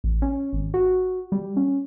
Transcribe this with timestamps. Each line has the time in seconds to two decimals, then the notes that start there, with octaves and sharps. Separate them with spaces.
0.04 A1
0.22 C#4
0.53 G#1
0.74 F#4
1.32 G3
1.56 C#4